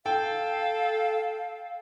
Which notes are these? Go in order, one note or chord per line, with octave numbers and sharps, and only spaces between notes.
A4 F5 G5